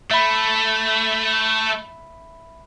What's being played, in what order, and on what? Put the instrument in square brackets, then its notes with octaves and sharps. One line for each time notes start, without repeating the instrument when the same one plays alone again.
[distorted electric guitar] A3 [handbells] E5 B5